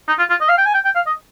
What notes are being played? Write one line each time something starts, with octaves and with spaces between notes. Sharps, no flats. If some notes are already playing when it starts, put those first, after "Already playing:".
D#4
F4
F4
D#5
F5
G5
G#5
G5
G5
F5
D#5